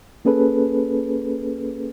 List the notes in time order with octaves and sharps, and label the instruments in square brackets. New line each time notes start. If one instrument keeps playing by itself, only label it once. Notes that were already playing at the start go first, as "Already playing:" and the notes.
[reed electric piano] A#3 C#4 G#4 A4 B4